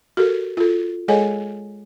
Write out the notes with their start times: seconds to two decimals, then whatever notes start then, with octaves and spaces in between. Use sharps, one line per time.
0.17 F#4 G4 A4 A#4
0.57 F4 A4
1.08 G#3 G#4 A4 C#5 D#5 G#5